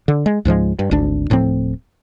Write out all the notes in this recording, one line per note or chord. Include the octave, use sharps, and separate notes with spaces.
D3
G#3
C#2 G#2 F3 G#3
G2
G#1 D2 D4
D1 A2 F3 C4